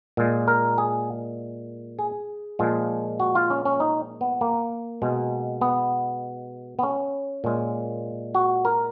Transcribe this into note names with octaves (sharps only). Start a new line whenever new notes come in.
A#2 G#3
A#4
G#4
G#4
A#2 F3 G#3
F#4
F4
C#4
C#4
D#4
B3
A#3
B2 G#3
B3
B3
C#4
A#2 G#3
F#4
A#4